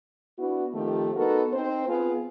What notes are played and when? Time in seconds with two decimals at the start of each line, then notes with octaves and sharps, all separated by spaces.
0.38 B3 D4 E4 F#4
0.74 D#3 F3 A3 C4 G4
1.16 B3 D#4 F#4 A4 A#4
1.53 C4 D#4 C5
1.87 B3 C4 F4 G#4